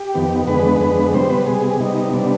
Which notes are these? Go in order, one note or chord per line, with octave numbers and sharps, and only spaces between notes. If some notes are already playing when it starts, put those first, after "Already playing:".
Already playing: G4
F2 D#3 B3
F2 D3 G#3 B3 B4
F2 D3 G#3 B3
C3 G3 B3 C5
B4
C3 G3 B3 G#4
C3 G3 B3 D#4
C3 G3 B3 D4